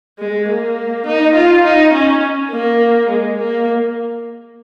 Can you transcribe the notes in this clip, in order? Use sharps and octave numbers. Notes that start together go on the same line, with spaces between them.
G#3
A#3
D#4
F4
D#4
C#4
A#3
G#3
A#3